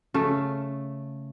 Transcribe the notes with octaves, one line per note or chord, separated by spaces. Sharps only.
C#3 A3